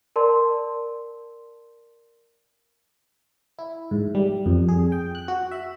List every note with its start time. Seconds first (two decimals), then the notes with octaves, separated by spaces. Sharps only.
0.16 A#4 D5 A5 C6
3.59 E4
3.91 G#2
4.15 G3
4.46 F2
4.69 G#4
4.92 G5
5.15 F#6
5.28 F#4
5.51 E5